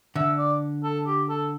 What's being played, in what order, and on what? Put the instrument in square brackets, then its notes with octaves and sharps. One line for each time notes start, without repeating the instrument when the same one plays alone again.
[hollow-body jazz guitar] D3 [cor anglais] E5
[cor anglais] D5
A4
G4
A4